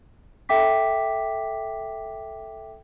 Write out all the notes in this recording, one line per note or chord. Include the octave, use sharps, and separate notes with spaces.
A4 E5 G5 D6 B6